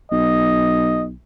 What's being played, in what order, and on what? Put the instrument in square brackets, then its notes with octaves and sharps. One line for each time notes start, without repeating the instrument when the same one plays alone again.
[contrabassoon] B1 [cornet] D#5